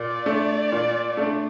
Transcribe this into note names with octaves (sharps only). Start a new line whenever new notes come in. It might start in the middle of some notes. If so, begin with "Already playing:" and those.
Already playing: A#2 D5
A3 D4
A#2
A3 D4